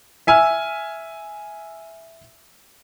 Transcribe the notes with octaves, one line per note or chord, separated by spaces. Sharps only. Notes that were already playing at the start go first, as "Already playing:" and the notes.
E5 G#5 E6 F6